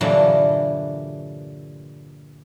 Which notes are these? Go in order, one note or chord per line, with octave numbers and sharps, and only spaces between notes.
G2 A#2 D3 E3 F#3